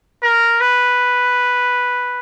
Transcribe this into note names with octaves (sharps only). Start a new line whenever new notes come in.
A#4
B4